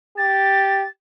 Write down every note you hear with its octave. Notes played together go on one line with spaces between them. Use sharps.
G4 A6